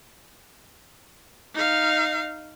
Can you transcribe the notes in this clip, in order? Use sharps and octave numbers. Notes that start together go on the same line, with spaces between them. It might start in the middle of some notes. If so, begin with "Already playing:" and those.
D#4 F5